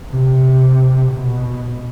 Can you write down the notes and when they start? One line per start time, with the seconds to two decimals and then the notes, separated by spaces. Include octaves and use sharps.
0.11 C3
1.12 B2